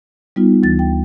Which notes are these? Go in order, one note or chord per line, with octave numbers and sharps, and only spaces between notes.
G3 B3 D#4 F4
D2 E3 A6
G5